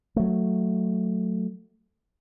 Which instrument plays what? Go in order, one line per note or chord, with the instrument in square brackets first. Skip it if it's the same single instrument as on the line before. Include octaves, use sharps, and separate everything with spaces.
[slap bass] F#3 A3